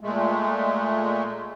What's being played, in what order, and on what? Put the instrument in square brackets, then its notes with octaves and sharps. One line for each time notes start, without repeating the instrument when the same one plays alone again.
[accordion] A#2 G#3 A3